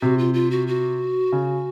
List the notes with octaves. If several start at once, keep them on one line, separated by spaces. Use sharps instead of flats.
C3 F#4
F4
F4
F#4
F#4
C#3